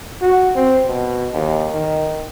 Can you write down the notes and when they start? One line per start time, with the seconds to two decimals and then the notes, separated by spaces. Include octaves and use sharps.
0.21 F#4
0.55 C4
0.87 B2
1.33 D#2
1.72 D#3